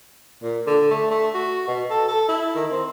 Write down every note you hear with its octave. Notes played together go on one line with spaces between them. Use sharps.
A#2
D3
A3
A3
F#4
B2
A4
A4
E4
D#3
C4